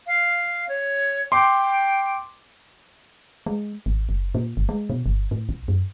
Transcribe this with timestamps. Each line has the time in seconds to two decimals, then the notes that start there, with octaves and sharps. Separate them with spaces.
0.07 F5
0.69 C#5
1.32 G5 C6 D6
3.46 G#3
3.86 G#1
4.09 F#1
4.35 A#2
4.57 G1
4.69 G#3
4.90 B2
5.06 G1
5.31 A2
5.49 B1
5.68 F#2